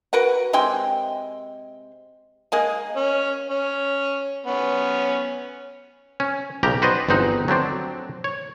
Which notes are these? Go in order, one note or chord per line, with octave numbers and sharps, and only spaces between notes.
F#4 A#4 B4 F#5
C3 G#3 G5 C6
G#3 A#3 G#4
C#4
C#4
B3 C#4
C#4
B1 C#3 G4 A#5
F#4 B4 C5 D5 D#5
G1 E2 C4 D#4 F#5
F#3 A3 C4 D4
C#5